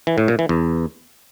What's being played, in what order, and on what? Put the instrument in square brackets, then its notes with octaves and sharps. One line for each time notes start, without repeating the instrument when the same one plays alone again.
[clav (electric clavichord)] E3
A2
A#2
E3
E2